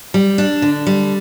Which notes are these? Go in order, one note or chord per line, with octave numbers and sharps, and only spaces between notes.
G3
D4
D3
G3